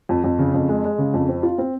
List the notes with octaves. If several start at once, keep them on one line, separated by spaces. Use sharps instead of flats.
F2
F2
C#3
F2
G#3
G#3
C#3
F2
C4
F4
C4